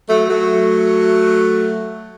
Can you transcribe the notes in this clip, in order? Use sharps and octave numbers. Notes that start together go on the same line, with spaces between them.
F#3 A3
F#3 A3